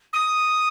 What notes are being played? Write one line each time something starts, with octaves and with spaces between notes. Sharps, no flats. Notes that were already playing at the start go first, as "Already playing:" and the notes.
D#6